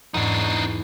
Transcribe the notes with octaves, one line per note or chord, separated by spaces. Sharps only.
E2 G#2 D4 D#4 C#5